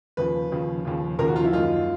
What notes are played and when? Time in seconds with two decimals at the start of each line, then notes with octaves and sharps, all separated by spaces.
0.17 D#2 C#3 F3 B4
0.52 D#2 C#3 F3
0.85 D#2 C#3 F3
1.19 D#2 C#3 F3 A#4
1.28 F#4
1.36 F4
1.44 E4
1.53 F#2 D#3 G#3 F4